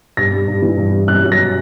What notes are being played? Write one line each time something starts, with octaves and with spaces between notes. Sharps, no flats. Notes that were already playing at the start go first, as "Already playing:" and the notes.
G2 A#6
G3
G2
E3
G2
G3
F#2 F#6
F#3
A#6